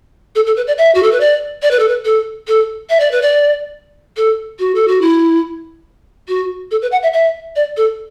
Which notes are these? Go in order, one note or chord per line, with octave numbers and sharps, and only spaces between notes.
A4
A4
B4
D5
E5
F#4
A4
B4
D5
D5
B4
A4
B4
A4
A4
E5
D5
B4
D5
A4
F#4
A4
F#4
E4
F#4
A4
B4
F#5
E5
E5
D5
A4